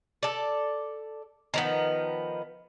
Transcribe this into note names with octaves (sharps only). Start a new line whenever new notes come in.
A4 D5
D#3 F3 B3